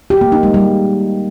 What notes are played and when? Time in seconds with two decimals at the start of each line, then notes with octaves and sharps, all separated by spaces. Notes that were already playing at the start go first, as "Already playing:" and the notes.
0.10 G4
0.21 A#3
0.32 D#4
0.43 G#3
0.54 G3